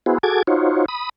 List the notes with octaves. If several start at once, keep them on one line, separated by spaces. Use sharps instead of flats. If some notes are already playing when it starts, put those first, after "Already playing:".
B3 E4 F#4 G#4 C5
F#4 G#4 A4 D6 G#6
D#4 F4 F#4 C5 C#5
B5 D#6